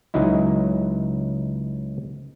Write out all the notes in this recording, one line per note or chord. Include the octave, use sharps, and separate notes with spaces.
C#2 F#3 D#4 E4